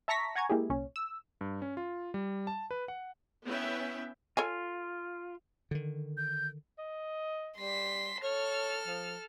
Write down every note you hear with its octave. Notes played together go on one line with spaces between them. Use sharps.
E5 A5 A#5 C#6 A#6 B6
F#5 G#5 A#5 C#6 G#6
G#3 A#3 E4 G4 G#4
C2 A#2 C#4
E6
G2
C#4
F4
G3
A5
B4
F#5
B3 C#4 E4 B4 E5 G5
F4 A4 C#5 G#5
D3 D#3
G6
D#5
G3 C6 B6
A4 C#5 F6
F3